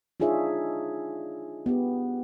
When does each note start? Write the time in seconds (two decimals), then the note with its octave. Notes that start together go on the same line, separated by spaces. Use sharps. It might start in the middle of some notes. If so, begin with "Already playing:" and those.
0.20 D4 D#4 F4 G#4 C#5 E5
1.66 B3 G4